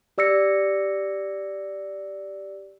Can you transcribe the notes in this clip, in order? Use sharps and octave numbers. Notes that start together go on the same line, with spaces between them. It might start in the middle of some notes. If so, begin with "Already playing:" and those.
G4 D5 E6 A#6 C#7